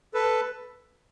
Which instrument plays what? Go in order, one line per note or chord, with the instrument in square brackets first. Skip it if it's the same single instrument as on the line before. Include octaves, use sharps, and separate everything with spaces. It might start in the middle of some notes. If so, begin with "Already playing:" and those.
[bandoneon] A4 B4